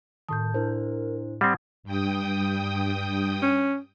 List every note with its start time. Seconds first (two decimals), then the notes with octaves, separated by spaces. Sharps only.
0.29 A2 D#3 A5 D#6 G6
0.54 D4 E4 A#4 C5
1.41 G3 C4 F#5 D#6 G#6
1.83 G2 G5 D#6
3.42 C#4